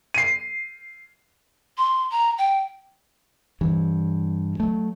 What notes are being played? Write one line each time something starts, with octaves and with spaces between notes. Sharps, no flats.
C7 D#7
C6
A#5
G5
G2 E3
F#3 A3